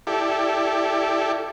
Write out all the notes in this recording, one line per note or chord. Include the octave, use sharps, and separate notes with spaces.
E4 G4 A4 D5